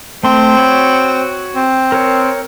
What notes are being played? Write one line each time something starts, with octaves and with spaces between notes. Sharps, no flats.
A3 C4 C6
F#4 C#5 B5
C4
A#4 C#5